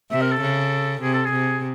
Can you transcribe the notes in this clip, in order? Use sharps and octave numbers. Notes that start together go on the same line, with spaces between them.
C3 E5
A#4
A4
C#3
C3 G#4
A4
G#4
C3